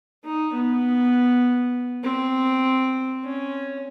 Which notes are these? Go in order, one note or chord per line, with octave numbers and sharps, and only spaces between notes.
D#4
B3
C4
C#4